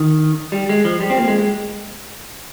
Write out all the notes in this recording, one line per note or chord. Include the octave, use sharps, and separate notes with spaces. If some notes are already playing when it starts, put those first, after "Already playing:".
Already playing: D#3
G3
G#3
F3
G3
C4
A#3
G#3
G#3